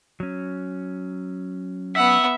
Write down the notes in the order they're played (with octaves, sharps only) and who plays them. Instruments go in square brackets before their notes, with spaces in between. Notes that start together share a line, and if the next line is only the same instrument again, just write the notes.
[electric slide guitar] F#3 C#4
[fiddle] B3 F#5 [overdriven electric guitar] E5